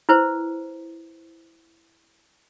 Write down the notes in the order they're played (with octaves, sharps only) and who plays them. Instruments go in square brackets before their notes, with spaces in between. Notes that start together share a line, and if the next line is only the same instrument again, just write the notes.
[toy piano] E4 B4 C5